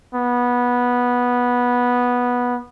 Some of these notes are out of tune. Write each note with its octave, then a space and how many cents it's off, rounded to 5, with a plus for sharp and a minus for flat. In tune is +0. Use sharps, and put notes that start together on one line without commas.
B3 -10